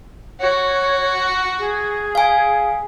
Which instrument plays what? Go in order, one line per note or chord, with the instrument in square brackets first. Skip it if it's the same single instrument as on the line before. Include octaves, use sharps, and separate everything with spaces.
[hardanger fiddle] F#4 [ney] C#5
[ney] G#4
[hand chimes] F5 G#5